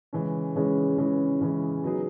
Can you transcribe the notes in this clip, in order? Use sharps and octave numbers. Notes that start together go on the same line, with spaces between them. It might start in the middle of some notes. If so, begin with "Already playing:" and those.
C#3 E3 G#3 C#4
C#3 E3 G#3 C#4
C#3 E3 G#3 C#4
C#3 E3 G#3 C#4
F#3 B3 D#4 G#4